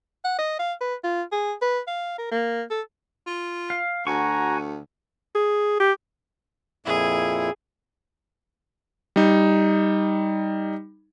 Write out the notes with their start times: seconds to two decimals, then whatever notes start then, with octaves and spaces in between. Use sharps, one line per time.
0.24 F#5
0.38 D#5
0.59 F5
0.81 B4
1.04 F4
1.32 G#4
1.62 B4
1.87 F5
2.18 A#4
2.31 A#3
2.70 A4
3.27 F4
3.70 F5
4.07 D2 F#4 F#5 G#5 A#5 C#6
5.35 G#4
5.80 G4
6.86 F2 A#2 E4 G#4
9.16 G3 D#4